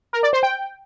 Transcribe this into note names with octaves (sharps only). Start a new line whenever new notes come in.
A#4
D5
C5
G5